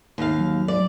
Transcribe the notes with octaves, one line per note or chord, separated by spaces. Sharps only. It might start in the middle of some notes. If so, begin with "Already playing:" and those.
D#2 F5
F#3
D5